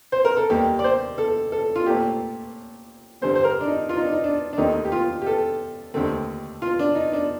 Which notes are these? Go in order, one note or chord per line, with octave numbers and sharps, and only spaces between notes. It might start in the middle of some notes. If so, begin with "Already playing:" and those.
C5
A#4
A4
D#2 D#3 G3 A#3 G4
D5
C5
A4
A4
F4
A#2 A3 C4 G4
G2 D3 G3 C4 C5
C5
A#4
D4
D#4
F4
D#4
D4
D#4
D4
D4
D#2 D#3 A3 C4 D#4
G4
F4
G4
A4
D#2 D3 A3 C4
F4
D4
D#4
D4